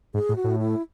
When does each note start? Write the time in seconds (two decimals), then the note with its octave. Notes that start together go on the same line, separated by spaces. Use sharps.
0.14 G#2 G#4
0.29 A2
0.36 F#4
0.44 A2
0.59 E4